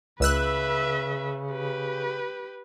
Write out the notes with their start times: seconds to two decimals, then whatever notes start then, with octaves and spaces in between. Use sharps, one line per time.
0.20 C#2 C#3 B4 E5 E6 F#6
1.50 G4 B4